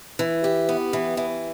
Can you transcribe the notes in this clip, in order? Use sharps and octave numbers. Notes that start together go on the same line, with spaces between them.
E3
G4
B3
E3
E3